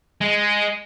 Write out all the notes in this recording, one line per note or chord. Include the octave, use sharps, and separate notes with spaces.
G#3